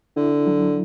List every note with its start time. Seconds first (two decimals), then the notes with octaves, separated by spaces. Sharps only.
0.16 D3 E4
0.47 F#3